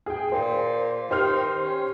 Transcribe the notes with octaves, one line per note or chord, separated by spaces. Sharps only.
G#4 G5
A#2 C5
D#3 G4 C5 F6
C#4